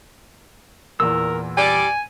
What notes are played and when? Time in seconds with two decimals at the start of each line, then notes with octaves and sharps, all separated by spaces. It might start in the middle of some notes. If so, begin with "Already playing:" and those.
1.00 E2 A#2 A#4 E6
1.57 G3 D5 G#5